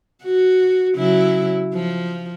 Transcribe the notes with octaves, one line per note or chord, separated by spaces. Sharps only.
F#4
C#3 F#3 E4
F3